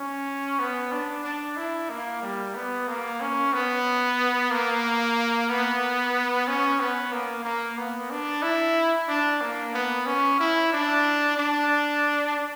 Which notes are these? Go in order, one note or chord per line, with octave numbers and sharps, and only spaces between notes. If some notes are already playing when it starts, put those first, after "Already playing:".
Already playing: C#4
B3
D4
D4
E4
A#3
G3
B3
A#3
C#4
B3
A#3
B3
C#4
B3
A#3
A#3
B3
D4
E4
D4
A#3
B3
C#4
E4
D4
D4